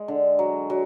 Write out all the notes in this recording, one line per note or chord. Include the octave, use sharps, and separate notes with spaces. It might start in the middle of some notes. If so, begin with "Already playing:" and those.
Already playing: G#3
D3
F#3
F#3